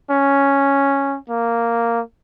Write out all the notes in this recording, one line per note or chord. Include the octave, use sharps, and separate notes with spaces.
C#4
A#3